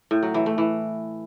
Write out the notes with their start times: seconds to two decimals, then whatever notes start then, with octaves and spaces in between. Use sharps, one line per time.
0.11 A2
0.23 F#3
0.34 E3
0.46 A3
0.58 E3